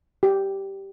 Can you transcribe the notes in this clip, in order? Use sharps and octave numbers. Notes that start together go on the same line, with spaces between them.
G4